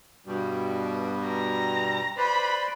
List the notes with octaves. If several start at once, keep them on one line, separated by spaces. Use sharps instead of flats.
G2 B2 G3
A#5
B4 C5 D5 B5